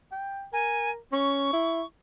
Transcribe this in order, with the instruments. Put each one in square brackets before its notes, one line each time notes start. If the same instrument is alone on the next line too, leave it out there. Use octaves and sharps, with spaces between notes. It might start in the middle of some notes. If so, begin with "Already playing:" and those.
[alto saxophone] G5
[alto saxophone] A#4 [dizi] G#5
[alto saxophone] C#4 [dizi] C#6
[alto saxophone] E4